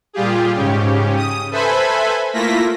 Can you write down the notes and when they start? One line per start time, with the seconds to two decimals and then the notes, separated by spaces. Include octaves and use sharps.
0.13 A#2 G3 F4 G4 G#4
0.55 G#2 C#3 C#4 G4
1.17 D#6
1.51 A4 B4 C5 E5 G#5 B5
2.33 A3 A#3 E4 F4 A#6 B6